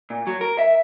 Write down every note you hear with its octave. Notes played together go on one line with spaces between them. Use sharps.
A#2
F#3
A#4
E5